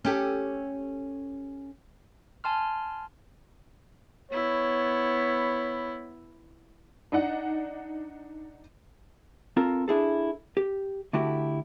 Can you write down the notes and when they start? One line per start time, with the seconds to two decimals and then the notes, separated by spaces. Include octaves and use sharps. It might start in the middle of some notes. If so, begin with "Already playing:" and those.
0.05 C#4 G4 A4
2.44 G#5 A5 C6 F6
4.31 B3 E4 C#5
7.12 D4 D#4 F#5
9.57 C4 F4 A4 A#4
9.88 D4 E4 G#4 A4
10.57 G4
11.13 D3 A3 E4 F#4 G4